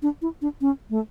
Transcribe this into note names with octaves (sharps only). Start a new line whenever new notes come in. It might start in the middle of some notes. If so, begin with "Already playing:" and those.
D4
E4
D4
C#4
A3